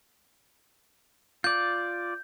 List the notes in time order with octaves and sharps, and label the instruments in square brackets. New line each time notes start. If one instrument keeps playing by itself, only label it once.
[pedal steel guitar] F4 D5 [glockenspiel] G6